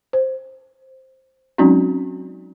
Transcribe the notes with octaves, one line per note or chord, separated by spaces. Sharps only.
C5
F#3 G#3 C4 C#4 D#4 F#4